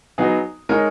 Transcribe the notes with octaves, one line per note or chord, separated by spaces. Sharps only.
F#3 B3 D#4 G#4
G#3 D#4 A#4 C#5